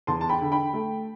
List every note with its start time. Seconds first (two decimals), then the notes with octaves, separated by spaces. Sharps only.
0.07 E2 A5 C6
0.21 A5
0.29 G5 B5
0.41 D3
0.52 G5 B5
0.73 A3